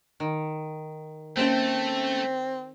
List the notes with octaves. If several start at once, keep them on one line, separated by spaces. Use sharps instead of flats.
D#3
A3 A#3 C4 C#4 C5 G5 A5